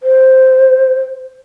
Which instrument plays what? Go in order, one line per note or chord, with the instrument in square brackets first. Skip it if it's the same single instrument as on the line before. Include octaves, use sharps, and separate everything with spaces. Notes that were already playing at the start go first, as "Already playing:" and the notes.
[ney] C5